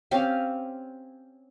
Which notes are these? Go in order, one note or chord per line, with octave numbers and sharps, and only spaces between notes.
C4 C#4 G4 F5